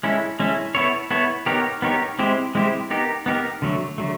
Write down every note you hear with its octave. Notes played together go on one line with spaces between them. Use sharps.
G#3 C#4 E4 A4
G#3 C#4 E4 A4
B3 E4 A4 C#5
B3 E4 A4 C#5
B3 D#4 G4 A#4 C#5
B3 D#4 G4 A#4 C#5
G#3 C4 E4 G4 C5
G#3 C4 E4 G4 C5
B3 D#4 G4 A#4
B3 D#4 G4 A#4
D3 F#3 A3
D3 F#3 A3